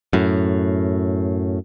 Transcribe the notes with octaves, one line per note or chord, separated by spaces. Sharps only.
F#2 A2